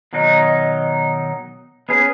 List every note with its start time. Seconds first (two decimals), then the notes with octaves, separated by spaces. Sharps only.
0.13 B2 D#3 F#3 D#4
1.89 B3 C#4 G#4 B4